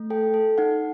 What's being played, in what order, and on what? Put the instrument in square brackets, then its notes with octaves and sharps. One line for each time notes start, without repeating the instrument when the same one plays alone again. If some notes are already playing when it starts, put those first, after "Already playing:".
Already playing: [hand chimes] A3
A4 G5
A4
D#4 F#5